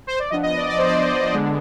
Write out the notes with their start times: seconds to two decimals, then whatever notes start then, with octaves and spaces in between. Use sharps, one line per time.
0.07 C5
0.19 D5
0.30 F3 B3 D4 D#5
0.43 D#5
0.57 D5
0.69 D5
0.78 C5
0.87 D5
1.33 D3 G#3 B3 D4